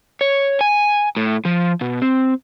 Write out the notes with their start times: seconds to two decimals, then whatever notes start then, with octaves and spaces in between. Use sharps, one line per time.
0.21 C#5
0.61 G#5
1.16 A2
1.45 F3
1.81 B2
2.02 C4